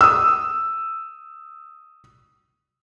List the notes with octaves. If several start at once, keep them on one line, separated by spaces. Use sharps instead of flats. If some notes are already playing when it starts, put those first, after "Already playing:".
D#6 E6